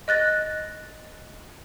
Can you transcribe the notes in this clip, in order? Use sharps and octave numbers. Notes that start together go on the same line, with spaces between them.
D#5 F#6 A6 A#6